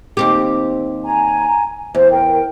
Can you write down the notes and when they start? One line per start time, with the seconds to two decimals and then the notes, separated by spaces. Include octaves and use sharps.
0.17 D#2 C4 G4
1.05 G#5 A#5
1.95 E2 C5
2.11 A#4 G5